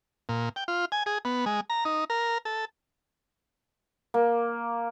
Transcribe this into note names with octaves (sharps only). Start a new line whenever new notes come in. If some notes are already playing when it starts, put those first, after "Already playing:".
A#2
G5
F4
G#5
G#4
B3
G#3
A#5
D#4
A#4
A4
A#3